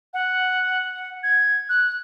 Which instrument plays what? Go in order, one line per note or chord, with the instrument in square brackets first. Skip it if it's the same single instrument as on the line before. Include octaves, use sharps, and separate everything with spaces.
[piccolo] F#5
G#6
F#6